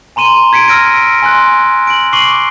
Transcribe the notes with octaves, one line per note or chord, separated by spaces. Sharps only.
G#5 A#5 C6 D#7 E7 G7
G#6 B6 C#7 D7
E6 F6 A#6 D7
G#5 C6 F#6
D7 F#7
C#6 D6 C7 D#7 F#7 G7